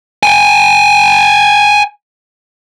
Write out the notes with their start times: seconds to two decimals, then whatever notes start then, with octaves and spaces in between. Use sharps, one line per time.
0.23 G5 G#5